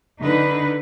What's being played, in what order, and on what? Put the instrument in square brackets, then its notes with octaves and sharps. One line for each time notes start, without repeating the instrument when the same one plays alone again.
[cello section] D3 D#4 B4